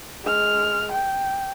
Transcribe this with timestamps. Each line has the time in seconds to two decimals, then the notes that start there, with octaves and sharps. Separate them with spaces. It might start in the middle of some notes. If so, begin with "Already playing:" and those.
0.24 G#3 F6
0.91 G5